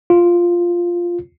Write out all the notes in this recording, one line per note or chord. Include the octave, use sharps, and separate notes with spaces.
F4